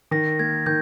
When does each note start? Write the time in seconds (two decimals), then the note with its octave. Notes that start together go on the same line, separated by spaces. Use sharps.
0.11 D#3 A#6
0.39 A#3 G#6
0.66 D#3 G6